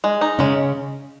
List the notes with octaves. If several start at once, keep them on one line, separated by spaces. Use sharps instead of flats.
G#3
D#4
C#3 G#3 C#4